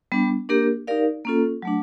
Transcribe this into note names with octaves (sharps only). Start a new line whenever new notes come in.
G3 B3 D4
A#3 D4 G4 A#4
D#4 G4 A#4 D5 F5
A#3 C#4 F4 A4
F#3 A3 D4